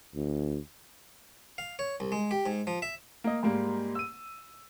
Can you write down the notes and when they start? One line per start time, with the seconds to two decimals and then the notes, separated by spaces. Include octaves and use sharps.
0.15 D2
1.58 F5
1.79 C#5
2.00 C2
2.12 G#3
2.31 G4
2.46 G#2
2.67 F3
2.82 E5
3.24 A#3 D#5
3.43 G#2 G3 A#3
3.95 E6 D#7